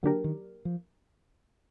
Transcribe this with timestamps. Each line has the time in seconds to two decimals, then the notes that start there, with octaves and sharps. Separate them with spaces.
0.03 D3 F#3 A#3 D4 G4 A#4
0.24 D#3
0.65 F3